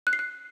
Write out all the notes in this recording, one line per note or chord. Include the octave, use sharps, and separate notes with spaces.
F#6
C7
F#6